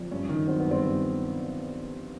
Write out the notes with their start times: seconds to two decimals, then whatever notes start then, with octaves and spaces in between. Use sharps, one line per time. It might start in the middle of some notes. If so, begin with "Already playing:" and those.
Already playing: F2
0.11 G2 C#4
0.29 D#3
0.47 F#3 C4
0.60 B3
0.66 G2
0.71 C4
0.83 G2